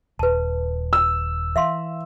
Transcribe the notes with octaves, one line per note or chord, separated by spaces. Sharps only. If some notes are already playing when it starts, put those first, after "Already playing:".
D#1 B4 A5
E6
E3 E5 F5 C6